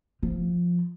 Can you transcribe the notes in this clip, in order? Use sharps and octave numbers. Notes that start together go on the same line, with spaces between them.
F3